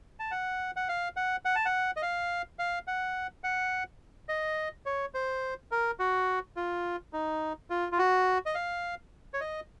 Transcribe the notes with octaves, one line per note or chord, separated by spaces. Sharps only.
A5
F#5
F#5
F5
F#5
F#5
A5
F#5
D#5
F5
F5
F#5
F#5
D#5
C#5
C5
A#4
F#4
F4
D#4
F4
F4
F#4
D#5
F5
C#5
D#5